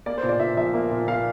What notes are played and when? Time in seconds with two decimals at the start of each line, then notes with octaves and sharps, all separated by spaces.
0.06 A#3 D5
0.18 C5
0.23 A#2
0.29 D5
0.40 A#2 E5
0.57 F3 E5
0.74 A#3
0.91 A#2
1.07 A#2 F5